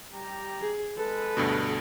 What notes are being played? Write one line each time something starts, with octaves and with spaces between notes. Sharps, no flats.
G3 G4 A#5
G#4
G#3 A4 B4
D2 G2 B2